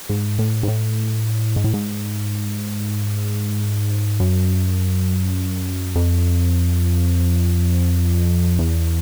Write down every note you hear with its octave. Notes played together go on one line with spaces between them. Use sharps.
G#2
A2
G#2
A2
G#2
A2
G#2
F#2
F2
E2